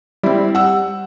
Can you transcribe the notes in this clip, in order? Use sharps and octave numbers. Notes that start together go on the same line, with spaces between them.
G3 C4 E4
F#5 E6